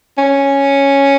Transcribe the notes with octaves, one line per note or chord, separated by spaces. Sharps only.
C#4